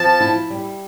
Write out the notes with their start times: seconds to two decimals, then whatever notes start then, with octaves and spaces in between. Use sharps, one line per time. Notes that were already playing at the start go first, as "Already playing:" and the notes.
Already playing: F3 C4 A5
0.20 E4
0.50 G3